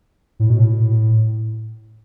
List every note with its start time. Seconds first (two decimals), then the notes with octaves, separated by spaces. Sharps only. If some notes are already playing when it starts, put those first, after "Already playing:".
0.40 A2
0.50 B2
0.60 A2